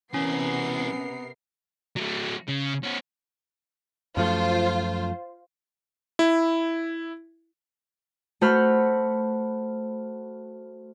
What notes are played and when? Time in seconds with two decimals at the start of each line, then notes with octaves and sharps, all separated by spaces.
0.14 C3 E3 B3 C#4 F#4 A#4 C7
1.96 F#3 A3
2.48 C#3
2.83 B3 C#4
4.17 F#2 F3 A3 F4 C5
6.19 E4
8.41 A3 F#4 C5 B5 F6